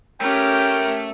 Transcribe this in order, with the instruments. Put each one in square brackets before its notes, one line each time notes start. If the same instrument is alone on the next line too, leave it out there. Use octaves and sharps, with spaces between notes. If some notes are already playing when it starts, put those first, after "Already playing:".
[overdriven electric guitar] A3 [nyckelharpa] C#4 G4 [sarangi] A#4 [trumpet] G5